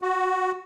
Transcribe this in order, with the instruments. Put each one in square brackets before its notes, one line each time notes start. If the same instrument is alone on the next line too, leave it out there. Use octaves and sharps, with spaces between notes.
[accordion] F#4